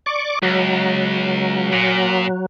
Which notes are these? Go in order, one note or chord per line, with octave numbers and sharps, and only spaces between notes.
D5 C#6 D6
C#2 F#3
A#2